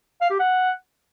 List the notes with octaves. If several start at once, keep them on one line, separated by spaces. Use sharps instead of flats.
F5
G4
F#5